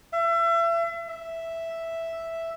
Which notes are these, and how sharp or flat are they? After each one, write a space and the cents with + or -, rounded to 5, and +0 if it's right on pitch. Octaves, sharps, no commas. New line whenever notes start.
E5 +35
E5 +0